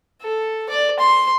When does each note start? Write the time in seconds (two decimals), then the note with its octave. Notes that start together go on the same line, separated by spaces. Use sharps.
0.22 A4
0.69 D5
1.00 C6